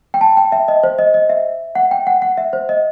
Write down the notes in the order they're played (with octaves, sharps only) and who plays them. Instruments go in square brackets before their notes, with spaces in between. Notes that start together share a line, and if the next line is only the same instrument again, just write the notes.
[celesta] G5
A5
G5
E5
D#5
C5
D#5
D#5
E5
F#5
G5
F#5
F#5
E5
C5
D#5